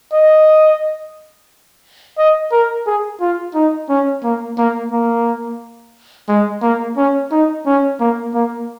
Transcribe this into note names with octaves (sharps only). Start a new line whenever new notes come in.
D#5
D#5
A#4
G#4
F4
D#4
C#4
A#3
A#3
A#3
G#3
A#3
C#4
D#4
C#4
A#3
A#3